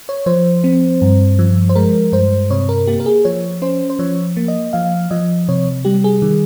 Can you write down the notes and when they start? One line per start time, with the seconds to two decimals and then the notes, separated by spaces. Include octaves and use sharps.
0.09 C#5
0.26 F3 C5
0.64 C4
1.02 G2
1.39 F3
1.69 C5
1.75 G#3 A#4
2.12 G2 C5
2.50 C3 C#5
2.69 A#4
2.87 A#3 G4
3.00 A#4
3.06 G#4
3.25 F3 C#5
3.62 C#4 C5
3.90 C5
3.99 F3 C#5
4.37 A#3
4.48 D#5
4.73 F3 F5
5.11 F3 D#5
5.48 C3 C#5
5.85 G3 G4
6.04 G#4
6.22 D#3